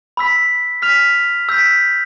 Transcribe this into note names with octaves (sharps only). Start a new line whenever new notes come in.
B5 E6 B6
F6 B6 F7
E6 G6 B6